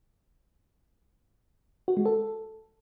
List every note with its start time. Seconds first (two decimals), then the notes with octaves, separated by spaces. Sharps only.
1.88 F#4
1.97 G#3
2.06 A4